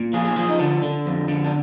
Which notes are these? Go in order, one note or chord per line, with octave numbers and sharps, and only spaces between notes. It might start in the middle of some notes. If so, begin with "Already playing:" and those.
Already playing: A#2
F3 G#4
G#4
F3 G#4
D#4
D3 D4
D3
F2
D3
D4